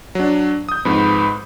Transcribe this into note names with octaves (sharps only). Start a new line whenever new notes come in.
F#3 D4
D#6 G6
F2 G#2 B4